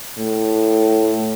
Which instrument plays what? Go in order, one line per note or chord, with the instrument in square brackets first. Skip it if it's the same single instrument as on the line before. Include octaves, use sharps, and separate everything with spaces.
[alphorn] A2